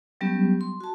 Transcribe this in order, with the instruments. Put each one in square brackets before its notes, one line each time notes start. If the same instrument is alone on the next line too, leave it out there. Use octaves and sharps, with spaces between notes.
[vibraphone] F#3 G3 B3 C#4 G4
C6
F#4 A5